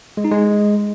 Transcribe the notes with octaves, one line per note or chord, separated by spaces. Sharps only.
G#3
D#4
G#3